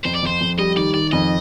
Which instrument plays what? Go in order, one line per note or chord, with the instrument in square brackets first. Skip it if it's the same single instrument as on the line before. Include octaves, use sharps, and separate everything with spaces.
[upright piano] F2 [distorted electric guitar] C5
[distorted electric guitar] D5
[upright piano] F2 [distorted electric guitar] C5
[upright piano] F2
[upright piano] G3 [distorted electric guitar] D#5
[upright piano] D#3 [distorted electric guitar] D5
[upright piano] D#3 [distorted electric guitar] D5
[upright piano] F2 [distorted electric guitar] D#5